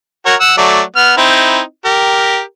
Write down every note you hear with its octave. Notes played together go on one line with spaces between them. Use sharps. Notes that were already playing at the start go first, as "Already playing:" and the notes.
F#4 A#4 C#5
F#5 E6
F#3 A3 D5
B3 F6
C4 D#4 E4
G4 A#4